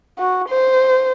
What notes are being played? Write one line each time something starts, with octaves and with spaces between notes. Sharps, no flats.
F#4
C5